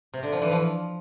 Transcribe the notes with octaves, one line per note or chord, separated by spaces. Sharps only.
C3
D3
F3
E3
F3